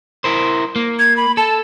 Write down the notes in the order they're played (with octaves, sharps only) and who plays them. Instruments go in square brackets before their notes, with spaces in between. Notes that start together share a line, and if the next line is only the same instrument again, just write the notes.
[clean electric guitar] E4 A#4 C5
A#3
[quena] G#6
B5
[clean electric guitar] A4 [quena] A5